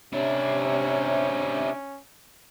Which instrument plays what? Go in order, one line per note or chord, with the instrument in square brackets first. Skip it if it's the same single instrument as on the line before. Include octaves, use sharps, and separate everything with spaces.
[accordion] C3 [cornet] C#4 [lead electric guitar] D4 E4 [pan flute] C#5